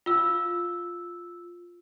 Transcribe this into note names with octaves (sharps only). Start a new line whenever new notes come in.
F4 E6